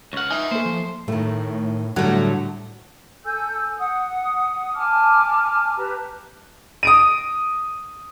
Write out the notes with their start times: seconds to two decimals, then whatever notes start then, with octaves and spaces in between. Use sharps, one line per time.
0.13 C#2 F#5 C#6 F6
0.31 D#4 E5 G#5
0.51 A#3 A4 C5
0.66 F3
1.08 A2 D#3 A3
1.96 A2 D3 F#3 G3 A3
3.24 A4 G#5 E6 G6
3.77 F#5 D#6
4.75 G#5 A5 D6 F6
5.77 G4 B4 A5 A#5
6.83 D#6 D7 D#7